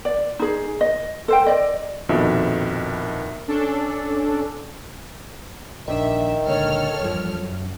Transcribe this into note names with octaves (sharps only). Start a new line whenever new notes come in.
D5
D#4 G#4
D#5
A4 C5 G5
D5 D#5
A#1 F2 B2 D#3 E5
C#4 D4 A4
A#1 D#3 D4 E5
C#2 A#2 D3 A4 C#5 F6
E2 G2 F3
F#2